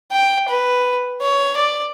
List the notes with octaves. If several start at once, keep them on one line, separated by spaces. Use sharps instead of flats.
G5
B4
C#5
D5